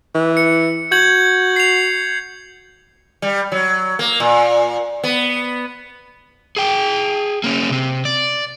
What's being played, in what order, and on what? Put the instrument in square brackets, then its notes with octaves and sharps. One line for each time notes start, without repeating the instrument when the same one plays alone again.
[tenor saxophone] E3
[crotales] C#7
[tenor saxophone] F#4 [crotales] G6 G#6 F#7
[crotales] C7 F7
[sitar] G3
F#3
A#3
A#2
B3
[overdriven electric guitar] G#4 G5
A#3 C#4
C3 C4
D5